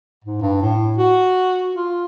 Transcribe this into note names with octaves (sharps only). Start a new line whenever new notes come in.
G#2
G2
A2
F#4
F4